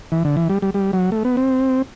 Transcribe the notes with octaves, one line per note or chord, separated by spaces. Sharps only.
E3
D3
E3
G3
G3
G3
F#3
A3
B3
C4